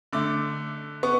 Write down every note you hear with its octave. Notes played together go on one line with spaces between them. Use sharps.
D3 A3 D6
B3 C#6